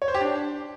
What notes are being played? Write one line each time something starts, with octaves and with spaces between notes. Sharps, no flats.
C#5
C5
G4
D4